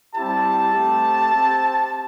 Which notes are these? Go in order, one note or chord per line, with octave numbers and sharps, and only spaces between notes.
G3 C4 E4 G4 A5
A3 C4 G4
C4 G4